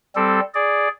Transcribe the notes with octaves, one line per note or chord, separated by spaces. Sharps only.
G3 C4 A4
G#4 D5